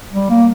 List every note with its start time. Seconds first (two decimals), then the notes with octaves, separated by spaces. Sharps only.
0.13 G3
0.30 A#3